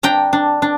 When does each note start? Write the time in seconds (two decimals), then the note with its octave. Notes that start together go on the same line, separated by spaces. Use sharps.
0.03 D4 G5 A#5
0.33 D4
0.62 D4